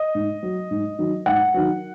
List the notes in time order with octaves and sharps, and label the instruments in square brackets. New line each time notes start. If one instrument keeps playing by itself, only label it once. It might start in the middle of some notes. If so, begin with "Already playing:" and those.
Already playing: [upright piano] D#5
G#2
F#3
G#2
D#3 F#3
G#2 F#5
D#3 F#3